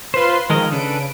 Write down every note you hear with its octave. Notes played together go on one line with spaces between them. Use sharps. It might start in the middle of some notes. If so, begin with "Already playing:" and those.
F4 B4 C5 C6
D#3 F3 G#3 A#4 D#5
C#3 D4 A4 B4 D7